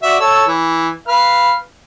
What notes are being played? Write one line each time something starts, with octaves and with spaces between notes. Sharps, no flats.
F#4 D5 E5
A4 C#5 E6
E3
B4 F5 F6